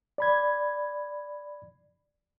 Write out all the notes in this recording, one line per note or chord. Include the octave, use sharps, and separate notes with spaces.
D5 B5 G#6